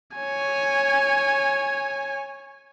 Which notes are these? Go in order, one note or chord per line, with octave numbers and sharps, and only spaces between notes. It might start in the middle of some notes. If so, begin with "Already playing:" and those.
C#5 G#5